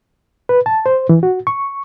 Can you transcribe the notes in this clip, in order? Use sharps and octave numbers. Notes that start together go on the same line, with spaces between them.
B4
A5
C5
E3
F#4
C#6